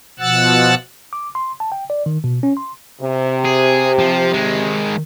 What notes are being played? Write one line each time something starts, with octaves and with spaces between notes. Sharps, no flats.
B2 F3 F#5 E6 F#6 A6
D6
C6
A5
G5
D5
D#3
B2
C#4
C6
C3
G#4
F3
D#3 G#3